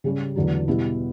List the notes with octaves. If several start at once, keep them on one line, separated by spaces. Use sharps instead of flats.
C#3 G3 C#4 G4
E2 D3 F#3
B2 G3 B3 E4